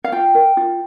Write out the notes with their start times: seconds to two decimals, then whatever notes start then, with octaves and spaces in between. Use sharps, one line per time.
0.04 F5
0.12 F4 G5
0.35 A#4
0.57 F4